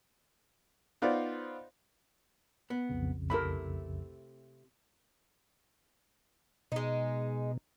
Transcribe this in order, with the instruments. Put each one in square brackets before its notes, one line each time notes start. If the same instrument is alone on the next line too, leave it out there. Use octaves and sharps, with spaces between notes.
[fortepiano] B3 D#4 F4 C5 D5
[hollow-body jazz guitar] B3
[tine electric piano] B1 F2 C#3
[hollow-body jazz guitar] C3 A3 E4 [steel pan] A#4 B5
[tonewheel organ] B2 [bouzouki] G#3 D#4